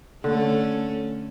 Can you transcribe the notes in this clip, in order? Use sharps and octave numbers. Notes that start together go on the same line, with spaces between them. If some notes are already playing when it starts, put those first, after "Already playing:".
D3 A3 C#4